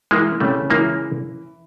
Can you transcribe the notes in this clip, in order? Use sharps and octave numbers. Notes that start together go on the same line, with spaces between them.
E3 G#3 A#3
C#3 G3 A3
E3 G#3 A#3